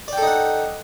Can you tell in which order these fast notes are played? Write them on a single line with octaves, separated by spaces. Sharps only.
D5 G5 A4 D#4 F#5